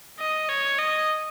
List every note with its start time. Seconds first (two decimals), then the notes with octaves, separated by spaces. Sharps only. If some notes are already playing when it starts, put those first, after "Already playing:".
0.19 D#5
0.49 C#5
0.79 D#5